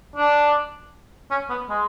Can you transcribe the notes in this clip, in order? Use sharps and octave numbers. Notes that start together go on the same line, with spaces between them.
D4
C#4
B3
G#3